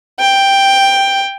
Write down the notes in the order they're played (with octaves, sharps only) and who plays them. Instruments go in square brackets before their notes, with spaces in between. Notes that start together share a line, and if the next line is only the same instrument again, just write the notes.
[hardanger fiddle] G5